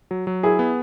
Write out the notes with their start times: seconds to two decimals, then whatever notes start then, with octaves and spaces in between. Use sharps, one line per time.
0.11 F#3
0.27 F#3
0.43 E4 G#4
0.59 B3